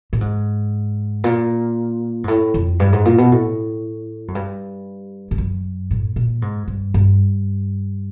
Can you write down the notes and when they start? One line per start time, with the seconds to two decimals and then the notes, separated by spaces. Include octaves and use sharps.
0.13 A2
0.21 G#2
1.24 A#2
2.24 G#2
2.28 A2
2.54 F2
2.80 G2
2.93 G#2
3.05 A#2
3.18 B2
3.32 A2
4.28 F#2
4.35 G2
5.31 G2
5.38 F#2
5.91 A2
6.16 A#2
6.42 G#2
6.68 G2
6.94 G2